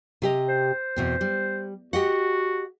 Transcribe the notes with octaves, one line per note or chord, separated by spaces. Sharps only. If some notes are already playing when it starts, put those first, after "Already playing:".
C3 G4 D#5
C5
E2 B2 C4
G3
F#4 G4 D#5 F#5